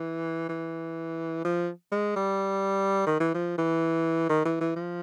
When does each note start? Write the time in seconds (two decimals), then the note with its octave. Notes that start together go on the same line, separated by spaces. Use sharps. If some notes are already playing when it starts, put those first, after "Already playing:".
Already playing: E3
0.49 E3
1.45 F3
1.92 G#3
2.16 G3
3.07 D#3
3.20 E3
3.34 F3
3.58 E3
4.30 D#3
4.46 E3
4.61 E3
4.76 F3